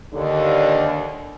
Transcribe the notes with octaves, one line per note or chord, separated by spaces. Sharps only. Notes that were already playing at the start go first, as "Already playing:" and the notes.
D#2 D3